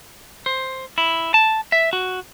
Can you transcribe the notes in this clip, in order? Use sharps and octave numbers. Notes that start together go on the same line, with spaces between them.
C5
E4
A5
E5
F#4